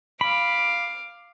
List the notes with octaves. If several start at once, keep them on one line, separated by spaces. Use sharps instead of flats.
F5 B5 D6